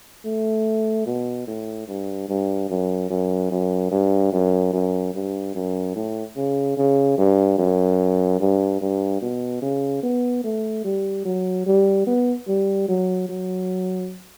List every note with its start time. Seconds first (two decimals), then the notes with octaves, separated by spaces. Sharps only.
0.25 A3
1.06 B2
1.47 A2
1.88 G2
2.28 G2
2.69 F#2
3.10 F#2
3.51 F#2
3.91 G2
4.32 F#2
4.73 F#2
5.14 G2
5.55 F#2
5.96 A2
6.36 C#3
6.77 C#3
7.18 G2
7.58 F#2
8.40 G2
8.81 G2
9.22 B2
9.62 C#3
10.03 B3
10.44 A3
10.84 G3
11.25 F#3
11.66 G3
12.07 B3
12.48 G3
12.88 F#3
13.29 F#3